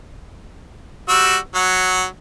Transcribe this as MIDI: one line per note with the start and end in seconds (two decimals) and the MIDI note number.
1.09 1.37 55
1.09 1.37 66
1.09 1.37 88
1.55 2.04 54
1.55 2.04 78